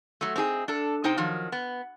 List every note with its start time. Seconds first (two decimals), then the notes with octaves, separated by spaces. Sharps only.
0.21 F#3 A3
0.36 C4 D#4 G4 G#4
0.68 D4 A4
1.04 C3 D#4 C5 G5
1.17 D#3 F3 F#3
1.52 B3